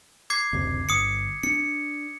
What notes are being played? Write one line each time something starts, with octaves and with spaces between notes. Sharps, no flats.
D6 G#6 C7
F#1 D2 C3
G1 D#6 C#7
C#4 D4 C#7